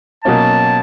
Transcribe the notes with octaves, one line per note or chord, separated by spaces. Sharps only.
B2 F#3 A#3 C#4 A5